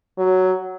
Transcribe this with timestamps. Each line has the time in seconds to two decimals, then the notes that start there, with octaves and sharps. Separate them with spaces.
0.18 F#3